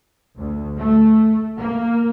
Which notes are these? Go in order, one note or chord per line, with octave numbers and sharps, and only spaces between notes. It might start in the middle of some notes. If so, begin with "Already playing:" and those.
D2
A3
A#3